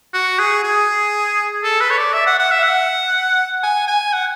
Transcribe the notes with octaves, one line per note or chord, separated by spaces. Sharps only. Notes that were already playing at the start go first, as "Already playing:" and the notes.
F#4
G#4
G#4
A4
B4
C#5
D5
E5
F#5
F#5
E5
F#5
G#5
G#5
F#5